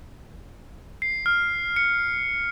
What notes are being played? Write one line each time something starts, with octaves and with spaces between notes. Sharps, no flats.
C7
F6
C#7